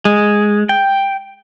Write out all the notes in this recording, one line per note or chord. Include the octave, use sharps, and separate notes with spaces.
G#3
G5